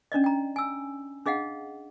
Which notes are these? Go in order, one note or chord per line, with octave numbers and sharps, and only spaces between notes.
C#4 D4 D5 D#5
G5 A#5
G#5 E6
D4 G#4 D#5 F5 F#5